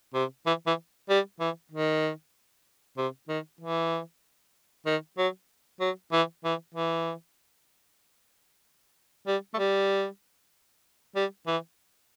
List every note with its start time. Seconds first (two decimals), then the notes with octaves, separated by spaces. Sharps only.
0.14 C3
0.46 E3
0.67 E3
1.10 G3
1.40 E3
1.72 D#3
2.97 C3
3.29 D#3
3.61 E3
4.86 D#3
5.18 F#3
5.80 F#3
6.12 E3
6.45 E3
6.75 E3
9.27 G3
9.54 A3
9.59 G3
11.16 G3
11.47 E3